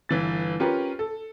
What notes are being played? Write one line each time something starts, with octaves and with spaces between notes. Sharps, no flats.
G1 E3 A6
C#4 F4 G4 A#4 B4
A4